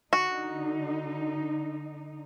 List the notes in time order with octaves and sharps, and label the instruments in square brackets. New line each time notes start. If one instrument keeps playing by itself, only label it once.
[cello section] D3 D#4 [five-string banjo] F#4